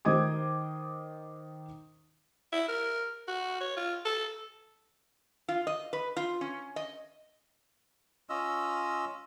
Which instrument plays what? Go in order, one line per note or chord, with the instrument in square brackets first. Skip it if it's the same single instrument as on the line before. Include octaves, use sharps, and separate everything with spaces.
[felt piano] D#3 C5 D#5 D6 D#6 G#6
[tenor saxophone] E4
A#4
F#4
C#5
F4
A4
[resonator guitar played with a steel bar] F4
D#5
B4
F4
C#4
D#5
[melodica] C#4 F4 D#5 E6